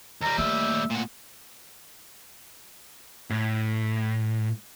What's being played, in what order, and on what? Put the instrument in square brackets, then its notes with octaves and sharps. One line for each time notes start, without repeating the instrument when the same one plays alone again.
[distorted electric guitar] D#2 G3 [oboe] A#5
[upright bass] A3 A#3 [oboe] E5
[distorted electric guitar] A#2 F#4
[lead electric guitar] A2